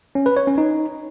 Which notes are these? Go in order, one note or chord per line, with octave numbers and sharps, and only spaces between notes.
C#4
B4
C#5
C#4
D#4